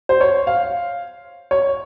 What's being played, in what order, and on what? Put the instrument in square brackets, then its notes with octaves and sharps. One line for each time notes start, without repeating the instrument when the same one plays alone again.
[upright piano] C5
C#5
F5
C#5